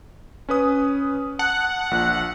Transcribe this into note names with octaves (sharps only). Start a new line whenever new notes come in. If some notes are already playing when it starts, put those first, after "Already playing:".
C#4 B4 D#6
F#5 A5
A#1 A#2